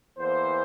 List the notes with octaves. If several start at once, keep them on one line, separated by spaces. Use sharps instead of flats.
E2 E3 A#3 C5